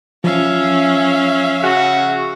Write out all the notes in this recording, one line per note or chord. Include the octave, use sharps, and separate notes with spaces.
F3 C#4 E5 F5
C#3 F#4